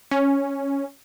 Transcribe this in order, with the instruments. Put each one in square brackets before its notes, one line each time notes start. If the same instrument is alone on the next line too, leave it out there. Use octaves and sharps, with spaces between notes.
[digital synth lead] C#4